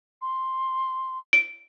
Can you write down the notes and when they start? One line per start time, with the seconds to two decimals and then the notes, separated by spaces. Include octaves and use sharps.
0.22 C6
1.33 D7